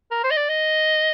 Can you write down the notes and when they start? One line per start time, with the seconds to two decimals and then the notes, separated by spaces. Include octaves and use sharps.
0.11 A#4
0.24 C5
0.31 D#5
0.37 D5
0.49 D#5